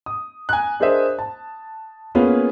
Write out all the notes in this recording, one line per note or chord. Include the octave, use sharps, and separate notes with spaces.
D#6
G#5 A#5 F#6
D4 G#4 A#4 C5 D#5 E5
A5
A#3 B3 C#4 F4 G#4 B4